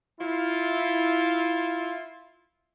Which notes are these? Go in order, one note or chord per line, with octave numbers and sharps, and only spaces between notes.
E4 F4